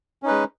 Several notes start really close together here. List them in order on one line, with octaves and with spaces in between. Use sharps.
C#4 D#4 B4 G#3